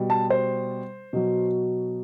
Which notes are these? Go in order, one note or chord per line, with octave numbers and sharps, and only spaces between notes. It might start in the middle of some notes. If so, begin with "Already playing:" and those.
Already playing: B2 G3
A5
C5
B2 F#3